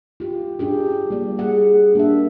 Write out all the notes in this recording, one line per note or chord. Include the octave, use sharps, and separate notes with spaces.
F4 G4
D4 G4 G#4
G3 A#3 D5
G#4 F#5
A#3 D4 E5